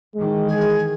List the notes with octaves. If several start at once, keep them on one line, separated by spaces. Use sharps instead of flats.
D#3 E3 G#3
G#4